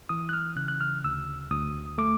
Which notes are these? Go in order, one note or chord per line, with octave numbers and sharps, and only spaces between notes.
E3 D#6
F#6
F6
C#3 F#6
F#6
F6
D2 E6
D2 D#6
A3 D6